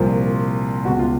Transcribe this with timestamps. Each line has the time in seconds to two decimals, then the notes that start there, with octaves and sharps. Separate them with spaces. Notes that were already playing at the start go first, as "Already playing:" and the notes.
Already playing: C2 A#2 F3
0.85 B2 F#4
0.88 C#2
0.99 F4